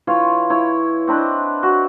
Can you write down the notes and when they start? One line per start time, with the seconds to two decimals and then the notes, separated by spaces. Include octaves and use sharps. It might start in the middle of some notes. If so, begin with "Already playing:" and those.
0.07 E3 F4 C#5 F5
0.50 E4 C#5
1.07 C4 D4 B4 D#5
1.63 F#4